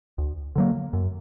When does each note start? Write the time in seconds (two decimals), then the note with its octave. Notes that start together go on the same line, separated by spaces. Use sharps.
0.18 D2
0.56 D3 F#3 A#3
0.93 F#2